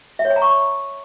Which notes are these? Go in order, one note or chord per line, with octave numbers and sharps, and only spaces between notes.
E5
C#5
G#5
A#5
C#6